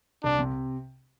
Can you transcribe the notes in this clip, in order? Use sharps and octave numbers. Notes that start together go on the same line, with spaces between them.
C2 D4
C3